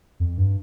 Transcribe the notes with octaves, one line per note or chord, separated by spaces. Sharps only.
F2
G2